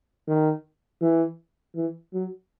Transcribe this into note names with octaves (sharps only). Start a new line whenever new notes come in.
D#3
E3
E3
F#3